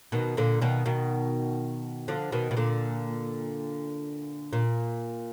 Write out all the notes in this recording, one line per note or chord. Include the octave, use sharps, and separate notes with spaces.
B2 D#3
A#2 D3
B2 D#3
B2 D#3
D3 F3
B2 D#3
B2
A#2 D3
A#2